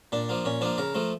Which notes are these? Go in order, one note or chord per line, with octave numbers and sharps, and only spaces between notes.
A#2 D4
F3 A#3
A#2 C#4
F3 A#3 D4
C#3 A#4
F3 A3